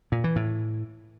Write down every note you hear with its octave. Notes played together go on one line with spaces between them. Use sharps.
A#2
E3
A2